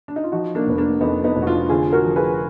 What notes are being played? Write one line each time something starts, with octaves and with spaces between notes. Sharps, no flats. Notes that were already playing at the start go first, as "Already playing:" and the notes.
D4
D#4
F4
F3 D#4 F#4
A#3 D4
F1 B3
A#3 D4
F2 B3 D#4
B3 D#4
F1
F#4
D4 F4
D3 F4 G#4
F#4 A#4
F3
G#4 B4